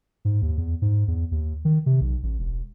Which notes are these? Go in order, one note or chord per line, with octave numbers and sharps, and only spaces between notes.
G#2
D#2
E2
G#2
E2
D#2
D#3
C3
B1
A1
E1